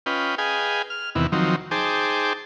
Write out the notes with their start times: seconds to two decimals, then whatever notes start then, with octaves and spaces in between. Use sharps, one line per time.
0.06 C#4 F4 B4 D#5 G5
0.38 G#4 B4 D#5 F5 G5 G#5
0.90 F6
1.15 E2 C3 D#3 B3 E4
1.32 D#3 F3 F#3 C4 D#4
1.71 D#4 G#4 C5 G5 A5 D6